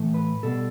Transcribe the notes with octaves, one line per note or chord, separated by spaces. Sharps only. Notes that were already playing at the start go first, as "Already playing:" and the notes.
Already playing: A2 E3 A3
B4
B2 G3 A4